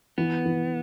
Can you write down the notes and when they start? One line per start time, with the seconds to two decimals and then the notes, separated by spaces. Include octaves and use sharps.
0.18 E3 B3
0.46 E3